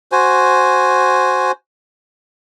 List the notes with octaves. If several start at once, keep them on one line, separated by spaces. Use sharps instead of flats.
F#4 C5 G#5